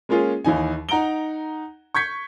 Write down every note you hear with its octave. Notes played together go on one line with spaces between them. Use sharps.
G#3 A#3 C#4 F4 G#4
D#2 E3 D#4 G#5
D#4 F#5 A#5 D7 G7
C#6 G6 G#6 B6 C#7